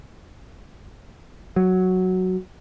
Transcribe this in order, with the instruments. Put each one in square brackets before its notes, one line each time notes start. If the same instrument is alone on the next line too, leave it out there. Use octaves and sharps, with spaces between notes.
[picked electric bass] F#3